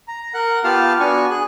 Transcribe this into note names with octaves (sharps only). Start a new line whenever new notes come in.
A#5
A#4 F#5 F#6
B3 F4 G4 F5 A5 F6
B3 D4 F#4 G#5 C#6
G#4 F#6